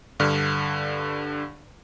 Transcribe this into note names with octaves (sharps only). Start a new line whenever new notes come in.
G2 D3 F6